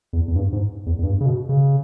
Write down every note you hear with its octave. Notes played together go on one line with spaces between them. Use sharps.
E2
E2
G2
G#2
E2
E2
G2
C#3
B2
C#3